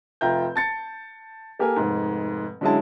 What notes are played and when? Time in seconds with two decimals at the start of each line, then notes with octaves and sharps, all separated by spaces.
0.21 F1 F4 E5 G5 A#5 G6
0.56 A5 A6 C#7
1.59 A#3 G4 A4 A#4 G#5
1.76 F1 G#2
2.61 D3 F#3 G#3 C#4 E4 A5